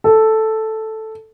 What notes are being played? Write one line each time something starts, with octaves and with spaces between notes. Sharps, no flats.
A4